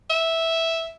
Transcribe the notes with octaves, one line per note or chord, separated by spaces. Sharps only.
E5